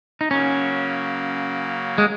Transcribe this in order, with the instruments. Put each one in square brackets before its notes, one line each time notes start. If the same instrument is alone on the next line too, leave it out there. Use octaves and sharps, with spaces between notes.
[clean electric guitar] D#4
[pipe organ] C#3 F#3 A#3 [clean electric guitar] C#4
[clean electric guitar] G#3